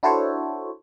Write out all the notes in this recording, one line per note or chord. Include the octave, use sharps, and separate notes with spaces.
D4 E4 F#4 A4 C5 C#5